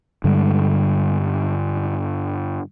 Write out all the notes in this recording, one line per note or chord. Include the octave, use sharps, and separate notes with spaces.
G2 D3 G3 G#3